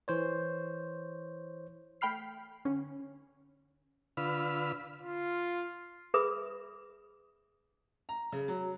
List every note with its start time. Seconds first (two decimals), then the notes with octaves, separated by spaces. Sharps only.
0.08 E3 C5 C#5
2.01 A3 G5 B5 F6 C7
2.65 D3 C#4
4.17 D3 F4 B4 B5 E6 F6
5.02 F4
6.14 G#4 B4 E5 B5 D#6
8.09 A#5
8.32 C#3
8.48 F#3